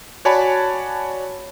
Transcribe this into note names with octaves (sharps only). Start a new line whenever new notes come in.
F#4 C#5 D5 G#5 A5 B5